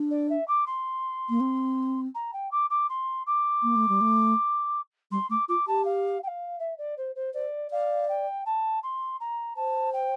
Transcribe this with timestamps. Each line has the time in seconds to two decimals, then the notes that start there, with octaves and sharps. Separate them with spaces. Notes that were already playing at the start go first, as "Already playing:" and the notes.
Already playing: D4
0.11 D5
0.29 E5
0.48 D6
0.66 C6
1.29 A#3
1.40 C4
2.15 A#5
2.33 G5
2.51 D6
2.70 D6
2.89 C6
3.26 D6
3.63 A#3
3.76 A3
3.89 G3
4.01 A3
5.11 G3 C6
5.29 A3 D6
5.48 F4 D6
5.67 G4 A5
5.85 F5
6.23 G5
6.27 F5
6.59 E5
6.78 D5
6.97 C5
7.15 C5
7.34 C5 D5
7.71 D5 F5
8.09 G5
8.46 A5
8.83 C6
9.20 A#5
9.56 C5 A5
9.93 G5